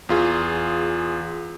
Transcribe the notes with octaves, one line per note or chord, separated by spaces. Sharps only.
E2 F4 G#4